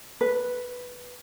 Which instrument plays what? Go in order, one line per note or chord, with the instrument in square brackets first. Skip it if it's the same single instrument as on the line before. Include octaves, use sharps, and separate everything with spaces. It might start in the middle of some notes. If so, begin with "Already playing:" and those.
[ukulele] B4